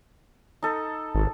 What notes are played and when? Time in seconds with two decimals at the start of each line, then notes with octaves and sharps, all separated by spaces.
0.63 D#4 A4
1.15 G#1